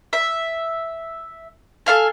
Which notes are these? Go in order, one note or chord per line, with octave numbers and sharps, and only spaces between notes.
E5
A4 F5 G#5